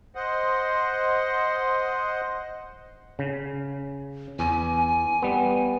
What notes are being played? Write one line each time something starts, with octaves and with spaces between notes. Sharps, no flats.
C5 D#5 F#5
C#3
E2 G#5
G3 B3